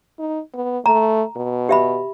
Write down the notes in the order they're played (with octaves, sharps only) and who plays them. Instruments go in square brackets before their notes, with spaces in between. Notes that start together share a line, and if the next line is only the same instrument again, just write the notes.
[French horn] D#4
B3
[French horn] A3 [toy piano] A#5
[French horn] B2
[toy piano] G4 E5 B5